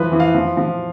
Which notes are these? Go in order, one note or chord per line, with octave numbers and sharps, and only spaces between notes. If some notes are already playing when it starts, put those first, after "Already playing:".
Already playing: E3 F3 B4
E3
F5
F3
F3